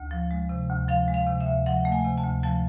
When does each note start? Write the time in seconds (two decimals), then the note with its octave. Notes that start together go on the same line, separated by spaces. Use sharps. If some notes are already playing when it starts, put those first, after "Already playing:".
Already playing: D2
0.11 F3
0.31 G#3
0.49 C3
0.70 D2
0.88 F3 F5
1.08 G#3
1.14 F5
1.27 C3
1.41 E5
1.47 D2
1.66 F3 F#5
1.85 A3
1.92 G#5
2.05 C3
2.18 A5
2.23 D2
2.43 F3 A5